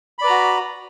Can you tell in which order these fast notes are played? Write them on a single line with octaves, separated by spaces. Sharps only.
B5 D5 B4 A#5 F#4